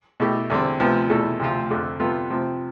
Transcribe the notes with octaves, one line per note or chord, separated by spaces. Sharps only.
B2 A3 E4 G4
E2 D3 G3 C4
D2 C3 F3 B3
E2 B2 A3 E4 A4
D2 C3 F3 C4 F4
F2 D3 A3
C3 G3 B3 F4 A4
C3 F3 C4